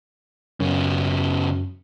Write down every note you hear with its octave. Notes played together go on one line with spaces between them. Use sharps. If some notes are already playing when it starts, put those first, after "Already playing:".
F#2 C#3 B3